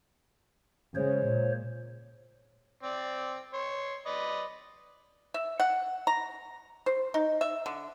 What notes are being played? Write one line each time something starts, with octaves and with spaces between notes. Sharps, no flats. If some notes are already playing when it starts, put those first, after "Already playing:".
C#3 G#3 C5 C#5
A#2
C4 D5
C#5 C6
B4 D5 D#5
E5
F#5
A#5
C5
D#4
E5
D3